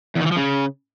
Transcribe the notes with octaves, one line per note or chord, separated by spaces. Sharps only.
E2
D#3
E3
F3
C#3